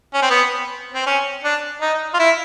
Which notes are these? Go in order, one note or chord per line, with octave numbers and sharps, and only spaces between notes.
C#4
C4
B3
C4
C#4
D4
D#4
F4
E4